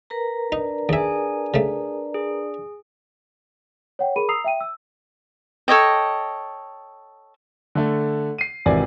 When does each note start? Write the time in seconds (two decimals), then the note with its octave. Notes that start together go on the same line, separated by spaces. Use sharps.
0.10 A#4 B4 A#5
0.52 D4 D#4
0.89 D#2 G#4 E5 G#5
1.54 C#3 A3
2.14 G#4
3.99 C#5 F#5 G5
4.16 G#4 A#4 B5 D#7
4.28 A#5 D#6 E6 C7 F7
4.44 E5 G5 D#7
4.60 E6
5.68 A4 C#5 D#5 G5
7.75 D3 A3
8.38 C7 D#7
8.66 G#1 C3 E3 D5 G#5